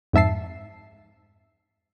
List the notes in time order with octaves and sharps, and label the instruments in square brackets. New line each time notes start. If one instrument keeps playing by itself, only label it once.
[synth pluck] F2 G#2 E5 A5 C7